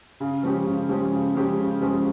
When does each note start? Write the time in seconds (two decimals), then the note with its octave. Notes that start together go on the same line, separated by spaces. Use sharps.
0.20 C#3
0.43 F3 G#3 C#4 G4
0.66 C#3
0.89 F3 G#3 C#4 G4
1.12 C#3
1.35 F3 G#3 C#4 G4
1.59 C#3
1.81 F3 G#3 C#4 G4